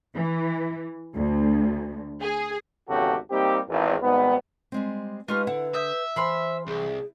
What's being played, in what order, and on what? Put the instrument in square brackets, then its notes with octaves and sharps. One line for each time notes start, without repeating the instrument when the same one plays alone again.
[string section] E3
D2
G#4
[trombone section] G#1 E2 C#3 F#4 G4 A4
G3 A#3 C4 D#4 G4
G#1 E2
G#1 G#2 G3 B3
[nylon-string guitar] G3 G#3 C4
[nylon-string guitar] G#3 D#4 G4 [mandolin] F4 C#6 F6 [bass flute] B4
[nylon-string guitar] D3 F#5 [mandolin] E4
[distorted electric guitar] E5 [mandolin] D#6 G6
[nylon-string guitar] E3 [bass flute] C5 [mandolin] B5 C6 F6
[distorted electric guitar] C2 [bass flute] G#4